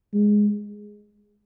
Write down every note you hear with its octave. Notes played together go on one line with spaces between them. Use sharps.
G#3